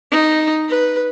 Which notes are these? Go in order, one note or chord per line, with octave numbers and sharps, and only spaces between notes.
D#4
B4